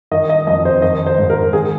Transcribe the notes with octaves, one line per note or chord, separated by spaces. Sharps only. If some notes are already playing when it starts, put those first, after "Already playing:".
D#3 D#5
D#5
F2 D#5
C5
D#3 D#5
C5
G#2
A#4
D#3 G#4